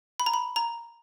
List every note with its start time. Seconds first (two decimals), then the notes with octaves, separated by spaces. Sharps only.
0.20 B5
0.26 A#5
0.34 B5
0.56 A#5